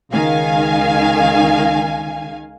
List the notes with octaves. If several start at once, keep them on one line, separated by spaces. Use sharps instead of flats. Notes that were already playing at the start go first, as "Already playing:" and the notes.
C#2 D#3 F5 G#5